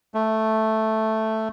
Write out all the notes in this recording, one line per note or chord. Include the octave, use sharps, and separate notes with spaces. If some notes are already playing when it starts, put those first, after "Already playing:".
A3